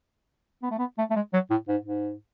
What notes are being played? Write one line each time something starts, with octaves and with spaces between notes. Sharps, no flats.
B3
A3
B3
A3
A3
G#3
F#3
A2
G#2
G#2